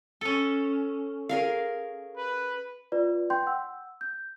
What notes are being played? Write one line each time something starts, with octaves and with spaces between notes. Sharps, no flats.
C#4 A4
G#4 A#4 F5
B4
F4 B4 D5
G5 C6 G6
F#5 E6
G6